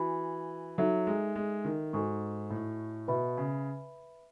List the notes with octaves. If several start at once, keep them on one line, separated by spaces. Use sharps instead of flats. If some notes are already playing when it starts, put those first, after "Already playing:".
Already playing: E3 F#4 G#5 B5
F#3 D#4 A4 E5
G#3
G#3
D#3
G#2 F#4 A4 D#5 G#5 C#6
A2
B2 B4 E5 B5
C#3